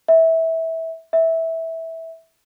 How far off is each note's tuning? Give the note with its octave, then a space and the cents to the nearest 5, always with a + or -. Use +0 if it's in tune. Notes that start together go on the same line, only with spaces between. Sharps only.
E5 -20
E5 -15